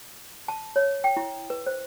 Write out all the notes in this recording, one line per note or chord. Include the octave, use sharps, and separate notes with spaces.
A5
C#5
G5
E4
B4
C5